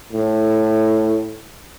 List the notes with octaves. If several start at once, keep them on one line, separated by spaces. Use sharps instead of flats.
A2